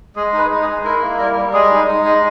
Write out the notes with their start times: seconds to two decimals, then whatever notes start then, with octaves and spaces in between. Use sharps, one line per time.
0.16 G#3 G#4
0.33 D#4
0.38 B4
0.51 D#4
0.62 G#4
0.68 G#3
0.84 E4 A#4
1.02 A#3
1.18 G3 A#4
1.36 G3
1.53 G#3 G#4
1.70 D#4
1.87 D#4
2.05 G#3